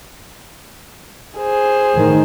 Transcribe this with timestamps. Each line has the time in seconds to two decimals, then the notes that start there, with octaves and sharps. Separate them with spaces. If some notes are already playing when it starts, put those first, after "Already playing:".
1.38 G#4 C5
1.93 A2 D#3